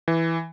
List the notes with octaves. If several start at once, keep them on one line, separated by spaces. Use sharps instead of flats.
E3